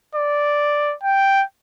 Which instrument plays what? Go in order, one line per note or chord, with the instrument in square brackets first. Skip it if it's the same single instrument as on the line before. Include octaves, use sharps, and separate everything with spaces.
[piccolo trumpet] D5
G5